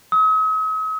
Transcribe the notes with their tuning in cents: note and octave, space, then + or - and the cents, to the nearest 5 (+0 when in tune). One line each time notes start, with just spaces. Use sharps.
D#6 +45